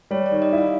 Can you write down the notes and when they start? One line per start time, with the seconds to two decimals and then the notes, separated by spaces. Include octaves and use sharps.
0.11 G3 C#5
0.26 D5
0.31 D#3
0.42 D#5
0.53 E4
0.58 F5